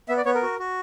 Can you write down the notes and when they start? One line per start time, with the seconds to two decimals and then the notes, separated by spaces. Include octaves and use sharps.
0.09 B3 E5
0.17 D5
0.25 B3 C#5
0.35 A#4
0.42 F#4
0.60 F#4